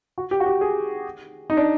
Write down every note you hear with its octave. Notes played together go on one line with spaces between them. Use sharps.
F#4
G4
F#4
G4
G#4
D#4
D4